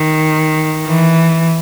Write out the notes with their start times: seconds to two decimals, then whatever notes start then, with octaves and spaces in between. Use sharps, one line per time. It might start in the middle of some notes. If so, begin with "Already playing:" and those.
Already playing: D#3
0.86 E3